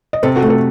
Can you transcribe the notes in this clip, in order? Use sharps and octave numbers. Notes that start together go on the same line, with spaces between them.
D#5
C3 A4 C5
F#4 A4
A3
F#4 A4